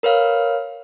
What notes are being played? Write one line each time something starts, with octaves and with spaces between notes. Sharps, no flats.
A#4 B4 C#5 F5 F6